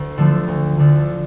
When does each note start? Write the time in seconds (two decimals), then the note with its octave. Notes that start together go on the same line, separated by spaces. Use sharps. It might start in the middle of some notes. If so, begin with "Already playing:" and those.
Already playing: D2
0.18 D3 F3 A3 D4
0.48 D2
0.79 D3 F3 A3 D4